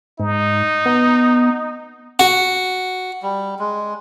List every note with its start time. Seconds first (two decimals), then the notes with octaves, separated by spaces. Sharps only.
0.20 G#2 D#4
0.86 B3
2.19 F#4
3.23 G3
3.59 G#3